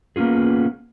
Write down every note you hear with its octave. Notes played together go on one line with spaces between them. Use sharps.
A#3 B3 C#4 F4 G#4